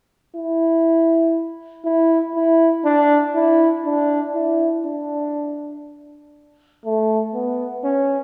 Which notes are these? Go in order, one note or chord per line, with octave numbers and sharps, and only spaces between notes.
E4
E4
E4
D4
E4
D4
E4
D4
A3
B3
C#4